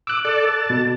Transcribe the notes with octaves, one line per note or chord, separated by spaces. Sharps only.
D6 E6 F#6
A4 D5
A5
B2